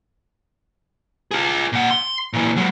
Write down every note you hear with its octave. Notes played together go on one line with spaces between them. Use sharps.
F4 G#4
A#2 F#5
C6
A#2 E3
F#3 G#3